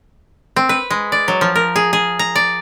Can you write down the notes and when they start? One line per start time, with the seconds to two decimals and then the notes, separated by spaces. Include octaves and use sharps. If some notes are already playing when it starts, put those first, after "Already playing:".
0.56 C4
0.69 B4
0.90 G#3
1.12 D5
1.28 F#3
1.41 F3
1.56 A#4
1.76 G#4
1.93 G#4
2.19 A#5
2.35 D5